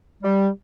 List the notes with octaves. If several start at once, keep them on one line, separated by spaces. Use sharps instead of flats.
G3